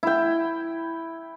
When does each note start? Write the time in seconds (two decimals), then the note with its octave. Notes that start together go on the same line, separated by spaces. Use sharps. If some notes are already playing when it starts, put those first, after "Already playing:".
0.03 E4 G5